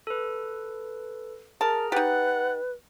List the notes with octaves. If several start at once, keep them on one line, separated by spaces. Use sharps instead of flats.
A4 B4
G#4 A#4 A5 A#5 F6
D#4 G4 B4 F#5 A6